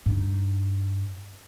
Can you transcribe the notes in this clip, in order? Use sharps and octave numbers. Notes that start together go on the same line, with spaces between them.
G2 D#4